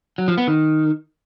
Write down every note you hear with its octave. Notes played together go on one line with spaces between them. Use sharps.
F#3
F3
B3
D#3